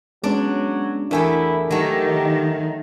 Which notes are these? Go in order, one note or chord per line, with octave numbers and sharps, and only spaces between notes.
F#3 G#3 B3 C#4 D4 D5
E2 A3 D4 E4 G4 A#4 G#5
D#3 F#3 A3 G4